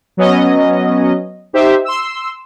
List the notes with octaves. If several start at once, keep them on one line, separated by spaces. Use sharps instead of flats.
F#3 B3 C#4 D#5
D#4 G4 C5 E5
C6 E6